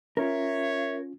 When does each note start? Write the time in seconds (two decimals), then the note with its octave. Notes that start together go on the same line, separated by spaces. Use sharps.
0.17 C#4 F4 A#4 C#5 E5